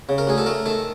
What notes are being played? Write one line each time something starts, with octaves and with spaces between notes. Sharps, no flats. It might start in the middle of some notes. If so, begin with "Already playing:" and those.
C#3
A#4
D2 G#4
A4
A3 A#4
D#3 A4